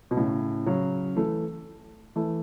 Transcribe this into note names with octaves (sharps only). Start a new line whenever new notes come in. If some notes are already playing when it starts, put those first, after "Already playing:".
B2
A2 C#3
C#3 F#3
E3 A3
E3 A3